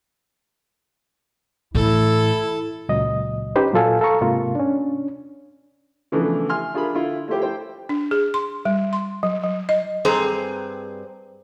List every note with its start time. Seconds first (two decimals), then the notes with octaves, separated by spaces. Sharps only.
1.75 A2 E3 E4 A4
2.89 C#2 A#2 F#3 D#5
3.56 C#4 D#4 G4 B4 C5
3.73 A#2 F#3 F4 A4 F5 G#5
4.01 A4 F5 A#5 C#6
4.21 G#2 C3 A#3 F4
4.55 C#4 D4
6.12 C#3 E3 F3 A3 B3 D4
6.49 E5 G#5 C6 F6
6.74 D4 F4 G#4 A#4 E5 B5
6.94 D3 E4 F4
7.28 A3 E4 F4 G4 C5
7.42 E4 A4 C5 G5
7.89 D4
8.11 G#4
8.34 C6
8.65 G3
8.93 C6
9.23 F#3
9.43 F#3
9.69 D#5
10.05 G2 C4 G#4 C5 A#5